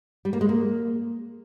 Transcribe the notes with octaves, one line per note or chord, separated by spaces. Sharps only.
G3
A#3
G#3
A#3